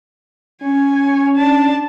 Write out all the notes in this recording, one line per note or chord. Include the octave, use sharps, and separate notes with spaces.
C#4 C#5 G#5
D4 A5